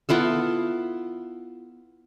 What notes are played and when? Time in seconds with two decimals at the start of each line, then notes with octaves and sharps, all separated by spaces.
0.09 B3 E4 F4 A4